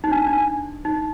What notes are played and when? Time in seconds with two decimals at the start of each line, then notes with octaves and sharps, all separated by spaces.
0.04 D#4
0.12 D4
0.27 D4
0.85 D#4